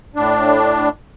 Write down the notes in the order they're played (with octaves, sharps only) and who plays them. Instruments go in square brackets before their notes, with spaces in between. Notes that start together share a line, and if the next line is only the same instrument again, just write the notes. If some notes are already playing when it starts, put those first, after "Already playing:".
[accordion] A2 D4